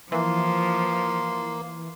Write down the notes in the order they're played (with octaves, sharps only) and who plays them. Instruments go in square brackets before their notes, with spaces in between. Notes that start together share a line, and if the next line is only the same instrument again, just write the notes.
[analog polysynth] E3 [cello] F3 [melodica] A#3 [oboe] C6